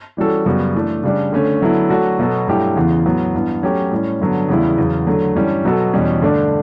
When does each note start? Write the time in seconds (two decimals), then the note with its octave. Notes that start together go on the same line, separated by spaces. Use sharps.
0.17 E3 G3 C#4 F#4 A4
0.45 F#2 C#3 G3 B3 F#4
0.75 E3 A3 D4 A4
1.03 C#3 G3 D4
1.32 D3 A3 C#4
1.62 D3 F#3 B3 E4 A4
1.90 F#3 A3 D4 F#4 A4
2.19 B2 F#3 B3 F#4 A4
2.47 G2 F#3 A3 E4 G4
2.76 E2 C#3 E3 B3
3.05 A2 F#3 B3
3.34 G2 E3 B3
3.63 F#3 A3 C#4 G4
3.91 A2 G3 C#4
4.21 G2 D3 F#3 B3
4.49 E2 C#3 G3 B3 E4
4.78 E2 C#3 F#3
5.07 D3 F#3 A3
5.35 G2 E3 G3 C#4
5.65 B2 F#3 B3 F#4 A4
5.93 E2 B2 G3 C#4
6.22 G2 D3 A3 D4